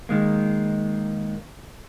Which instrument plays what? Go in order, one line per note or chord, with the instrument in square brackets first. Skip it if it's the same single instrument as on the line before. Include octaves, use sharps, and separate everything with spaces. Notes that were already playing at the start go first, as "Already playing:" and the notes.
[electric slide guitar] D#3 G#3 A#3